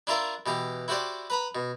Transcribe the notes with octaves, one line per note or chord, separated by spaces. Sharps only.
D4 E4 F4 A#4 E5 C6
B2 E3 G4
E4 F#4 G4 C5 D5
B4 A#5 B5
B2